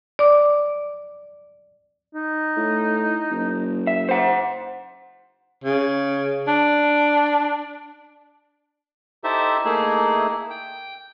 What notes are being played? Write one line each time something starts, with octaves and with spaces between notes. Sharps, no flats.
D5 D6
D#4
A2
F#1
E5
C5 F#5
C#3
D4
D#4 E4 G4 A4 C5 E5
A3 A#3 D#4 E4 G#4
G5